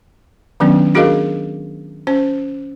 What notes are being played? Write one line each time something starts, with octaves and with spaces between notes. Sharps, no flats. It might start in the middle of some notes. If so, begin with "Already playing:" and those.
D#3 F#3 B3 C#4 D4
D4 F#4 G#4 A#4 D#5 F5
C#4 C5